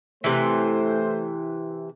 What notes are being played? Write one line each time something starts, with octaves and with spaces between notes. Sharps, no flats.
C3 E3 A3 C5